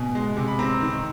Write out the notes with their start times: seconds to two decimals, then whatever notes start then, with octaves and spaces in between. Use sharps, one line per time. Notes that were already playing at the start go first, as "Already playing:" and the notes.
Already playing: B2 G#5
0.15 G#3
0.37 C3
0.48 B5
0.59 C4 A#5
0.81 D#3